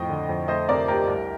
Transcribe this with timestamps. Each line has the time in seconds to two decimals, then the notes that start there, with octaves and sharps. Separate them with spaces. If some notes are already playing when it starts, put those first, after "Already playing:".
Already playing: F2 A2 D#5 G5
0.09 D3
0.29 F2
0.48 A3 C5 D#5
0.69 C3 A#4 D5
0.88 D2 G4 A#4
1.08 C2